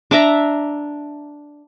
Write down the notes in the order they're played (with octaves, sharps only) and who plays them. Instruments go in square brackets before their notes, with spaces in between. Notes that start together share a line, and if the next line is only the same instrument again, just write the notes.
[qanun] D4 D5 E5 A#5